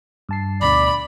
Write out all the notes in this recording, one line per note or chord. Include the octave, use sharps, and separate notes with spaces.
G2 A5 C7
D2 B2 D3 D5 B5